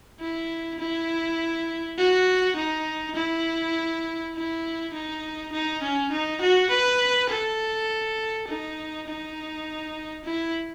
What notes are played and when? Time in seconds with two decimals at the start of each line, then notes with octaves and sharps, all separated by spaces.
0.20 E4
0.80 E4
1.98 F#4
2.56 D#4
3.16 E4
4.35 E4
4.94 D#4
5.53 D#4
5.82 C#4
6.11 D#4
6.41 F#4
6.70 B4
7.30 A4
8.48 D#4
9.07 D#4
10.25 E4